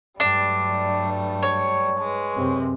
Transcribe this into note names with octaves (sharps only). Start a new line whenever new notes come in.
G2 F#3 G3 A3 D4
C#5
G#3 B4
F#2 C3 C4